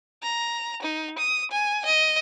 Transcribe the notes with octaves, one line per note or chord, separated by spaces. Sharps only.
A#5
D#4
D#6
G#5
D#5